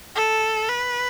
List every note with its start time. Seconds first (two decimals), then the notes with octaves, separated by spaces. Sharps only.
0.15 A4
0.68 B4